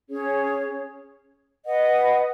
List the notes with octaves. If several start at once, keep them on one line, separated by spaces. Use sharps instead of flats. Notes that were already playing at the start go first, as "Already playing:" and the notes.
C#4 G#4 C#5
B4 D#5 F#5